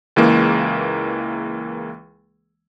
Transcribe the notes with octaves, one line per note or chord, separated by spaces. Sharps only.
C#2 E3 G#3 A#3